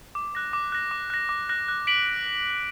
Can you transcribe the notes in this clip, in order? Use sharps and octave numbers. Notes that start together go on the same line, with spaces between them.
D6
F#6 A#6
D6
F#6 A#6
D6
F#6 A#6
D6
F#6 A#6
F#6
B6 D7 F#7